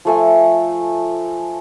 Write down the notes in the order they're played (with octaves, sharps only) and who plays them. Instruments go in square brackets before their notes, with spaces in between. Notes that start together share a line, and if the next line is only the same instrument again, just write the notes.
[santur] F3 A3 G#5